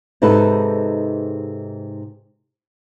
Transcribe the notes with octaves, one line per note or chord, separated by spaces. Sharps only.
G#2 C3 D#4 A4 B4